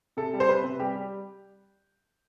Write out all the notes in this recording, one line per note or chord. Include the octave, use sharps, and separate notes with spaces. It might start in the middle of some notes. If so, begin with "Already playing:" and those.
C3 A4
G3
C5
C3 B4
C3
G3 G4
G3